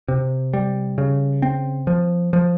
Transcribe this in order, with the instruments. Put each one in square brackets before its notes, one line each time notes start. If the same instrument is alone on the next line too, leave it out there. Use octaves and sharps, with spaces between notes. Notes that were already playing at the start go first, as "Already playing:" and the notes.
[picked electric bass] C3
G3
C#3
C4
F3
F3